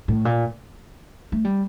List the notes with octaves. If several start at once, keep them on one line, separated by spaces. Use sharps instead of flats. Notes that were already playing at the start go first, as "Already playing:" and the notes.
A2
A#2
A3
G3